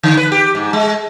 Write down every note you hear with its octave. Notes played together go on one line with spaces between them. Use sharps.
D3
B4
G4
G#2
G#3